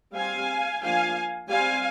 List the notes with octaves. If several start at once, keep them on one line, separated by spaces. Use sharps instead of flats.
G3 C4 F5 G#5
F3 A#3 D4 F5 G#5
G3 C4 F5 G#5